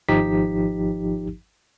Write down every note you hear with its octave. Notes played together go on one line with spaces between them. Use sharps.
G#1 F3 D#4 G4 B6